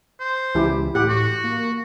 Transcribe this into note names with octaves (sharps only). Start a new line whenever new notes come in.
C5
C#2 E3 E4 G4
A2 G4 F#5
F#4
A#3